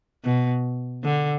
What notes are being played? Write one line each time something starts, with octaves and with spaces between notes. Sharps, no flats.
B2
D3